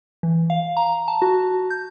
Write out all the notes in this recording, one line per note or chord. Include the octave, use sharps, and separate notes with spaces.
E3
F5
A#5
A5
F#4
G6